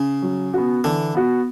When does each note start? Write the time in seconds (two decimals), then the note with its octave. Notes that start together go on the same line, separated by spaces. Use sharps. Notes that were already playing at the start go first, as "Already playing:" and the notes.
Already playing: C#3
0.22 F#3
0.54 B3 F#4
0.84 D3 E3
1.15 B3 F#4